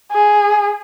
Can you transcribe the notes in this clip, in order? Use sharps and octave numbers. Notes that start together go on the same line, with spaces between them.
G#4